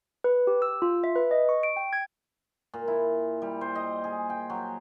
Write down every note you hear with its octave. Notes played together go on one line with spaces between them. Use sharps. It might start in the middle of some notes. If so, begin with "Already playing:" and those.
B4
G4
E6
F4
E5
B4
D#5
C#6
D7
G5
G#6
A#2
E4
G3
C5
D#5
G#4
G5
F#3